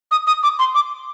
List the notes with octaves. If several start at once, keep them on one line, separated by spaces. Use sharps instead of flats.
D#6
D#6
D6
C6
D6